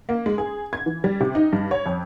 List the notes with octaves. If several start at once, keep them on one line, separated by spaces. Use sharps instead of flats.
A#3
G#3
G#4
G#6
E3
G3
C3
D#4
G2
C#5
F2